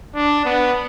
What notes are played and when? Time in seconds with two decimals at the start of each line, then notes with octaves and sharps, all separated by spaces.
0.15 D4
0.45 B3